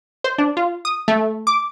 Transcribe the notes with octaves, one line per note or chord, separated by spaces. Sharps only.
C5
D4
F4
D#6
A3
D6